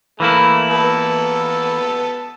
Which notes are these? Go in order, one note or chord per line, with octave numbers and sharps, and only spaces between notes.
E3 A3 A#3 E4
B3 A5 E6